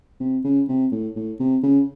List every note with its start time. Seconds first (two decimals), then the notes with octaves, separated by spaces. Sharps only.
0.20 C3
0.44 C#3
0.68 C3
0.92 A2
1.16 A2
1.39 C3
1.63 C#3